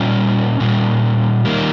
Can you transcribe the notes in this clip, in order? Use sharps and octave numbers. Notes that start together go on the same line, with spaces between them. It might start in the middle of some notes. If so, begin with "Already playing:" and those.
Already playing: A#2 G3 C#4
A#2 G3
D#3 G3 A#3